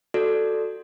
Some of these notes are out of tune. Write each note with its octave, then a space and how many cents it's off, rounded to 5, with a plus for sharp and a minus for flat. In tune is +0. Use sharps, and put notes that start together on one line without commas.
F#4 +0 A4 +0 D5 +0